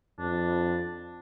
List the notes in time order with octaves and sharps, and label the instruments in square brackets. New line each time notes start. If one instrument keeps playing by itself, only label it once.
[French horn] F2 [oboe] D4